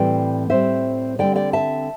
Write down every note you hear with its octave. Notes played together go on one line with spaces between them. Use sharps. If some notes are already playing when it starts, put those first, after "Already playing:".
Already playing: A2 E3 G3 C4 D5 G5
A2 G3 C4 C5 E5
D3 G3 C4 D5 G5
D5 G5
E5 A5